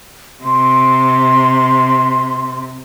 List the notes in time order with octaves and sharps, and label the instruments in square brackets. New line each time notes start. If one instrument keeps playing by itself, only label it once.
[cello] C3 [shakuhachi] C6